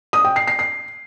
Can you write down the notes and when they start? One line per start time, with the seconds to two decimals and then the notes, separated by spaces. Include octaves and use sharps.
0.13 D#6
0.25 G5
0.36 C7
0.47 C7
0.59 C7